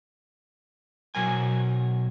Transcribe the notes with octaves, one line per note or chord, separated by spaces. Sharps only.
B2 F#3 A#4 G#5